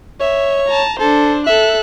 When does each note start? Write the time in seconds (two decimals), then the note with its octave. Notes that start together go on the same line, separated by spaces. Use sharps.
0.21 C#5 E5
0.67 A5 A#5
1.00 D4 A4 C5
1.47 A4 E5 F#6